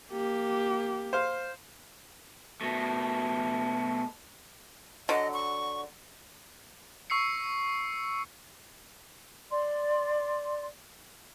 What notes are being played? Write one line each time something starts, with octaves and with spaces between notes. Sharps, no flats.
A#3 G4
C5 F5
B2 A3
D3 F#3 D#5
C#6
C#6 E6 C7 C#7
D5 C6